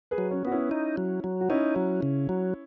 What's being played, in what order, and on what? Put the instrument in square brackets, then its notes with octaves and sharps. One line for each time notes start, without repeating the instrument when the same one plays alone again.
[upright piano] G#4 B4
[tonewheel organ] F#3
[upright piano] C#4
[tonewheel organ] B3 [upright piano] F#4
[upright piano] C#4 E4
[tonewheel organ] D#4
F#3
F#3
[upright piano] F#4
[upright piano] C#4 E4 [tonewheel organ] D#4
[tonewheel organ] F#3
C#3
F#3